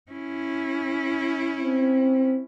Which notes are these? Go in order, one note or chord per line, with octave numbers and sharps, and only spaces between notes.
C#4 E4
C4